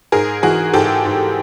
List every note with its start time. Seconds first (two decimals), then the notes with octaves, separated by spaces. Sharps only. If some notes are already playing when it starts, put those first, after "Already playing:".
0.12 G#2 G#4 A#4
0.43 E3 F#4 G#4
0.73 G#2 G4 A4
1.05 G#2